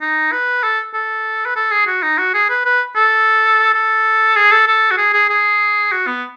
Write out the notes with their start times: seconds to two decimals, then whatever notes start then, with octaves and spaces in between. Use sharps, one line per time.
0.02 D#4
0.32 B4
0.64 A4
0.94 A4
1.46 B4
1.56 A4
1.71 G#4
1.87 F#4
2.03 D#4
2.18 F#4
2.34 G#4
2.50 B4
2.66 B4
2.96 A4
3.74 A4
4.36 G#4
4.51 A4
4.68 A4
4.91 F#4
4.98 G#4
5.13 G#4
5.30 G#4
5.92 F#4
6.07 B3